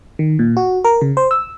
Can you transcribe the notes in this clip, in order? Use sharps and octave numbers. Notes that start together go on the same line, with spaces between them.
D#3
A#2
F#4
A#4
C#3
C5
E6